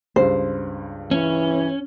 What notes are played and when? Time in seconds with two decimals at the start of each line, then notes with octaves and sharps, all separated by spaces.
0.16 C#2 G2 C5
1.11 E3 C#4